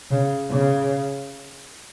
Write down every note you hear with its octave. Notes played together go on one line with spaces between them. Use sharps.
C#3
C#3